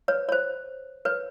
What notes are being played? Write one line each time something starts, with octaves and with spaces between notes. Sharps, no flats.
B4 C#5
C#5
C5
B4 C#5